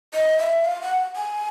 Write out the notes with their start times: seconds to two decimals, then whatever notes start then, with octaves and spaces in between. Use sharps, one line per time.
0.13 D#5
0.39 E5
0.65 F5
0.82 F#5
1.16 G#5